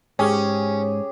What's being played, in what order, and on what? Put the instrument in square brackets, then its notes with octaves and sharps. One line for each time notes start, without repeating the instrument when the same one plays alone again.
[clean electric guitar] G#2 [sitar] C#4 [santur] G4 G#4